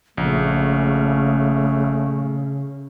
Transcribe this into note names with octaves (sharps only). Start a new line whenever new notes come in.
A#1 C#3 A3